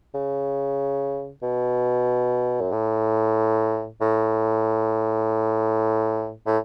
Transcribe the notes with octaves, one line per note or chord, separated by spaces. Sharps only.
C#3
B2
F#2
A2
A2
A2